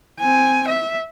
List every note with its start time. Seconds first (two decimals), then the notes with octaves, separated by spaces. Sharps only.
0.20 C4 G#5
0.68 E5